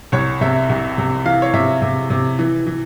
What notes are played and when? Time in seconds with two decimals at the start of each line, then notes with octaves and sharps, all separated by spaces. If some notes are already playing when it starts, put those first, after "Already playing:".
0.12 C2 C#5
0.41 C3 E5
0.69 C2
0.98 C3
1.25 E3 F5
1.42 C#5
1.54 C3 E5
1.82 C3
2.10 C3
2.39 E3
2.67 E3